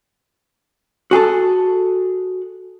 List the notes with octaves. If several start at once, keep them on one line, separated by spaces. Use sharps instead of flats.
F#4 G#4 A4 A5